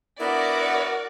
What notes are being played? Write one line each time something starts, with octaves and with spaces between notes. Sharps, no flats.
B3 D4 E4 F#4 A#4 D5